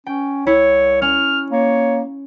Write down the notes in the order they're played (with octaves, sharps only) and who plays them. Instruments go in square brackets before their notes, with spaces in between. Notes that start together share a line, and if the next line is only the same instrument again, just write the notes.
[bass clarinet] C#4 [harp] G5
[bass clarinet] C2 [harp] E4 [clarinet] C#5
[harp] C#4 [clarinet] F6
[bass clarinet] A#3 [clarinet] C#5